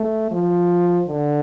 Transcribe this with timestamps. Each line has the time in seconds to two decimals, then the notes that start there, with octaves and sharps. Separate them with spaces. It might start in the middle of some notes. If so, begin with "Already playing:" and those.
Already playing: A3
0.31 F3
1.08 D3